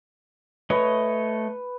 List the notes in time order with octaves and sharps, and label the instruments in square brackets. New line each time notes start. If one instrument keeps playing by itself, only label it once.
[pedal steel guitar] A3 C#5 D#5 [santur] B4